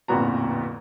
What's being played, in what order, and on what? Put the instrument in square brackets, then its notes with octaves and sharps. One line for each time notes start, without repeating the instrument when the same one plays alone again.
[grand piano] D1 F2 A#2 B3 F#4 A#5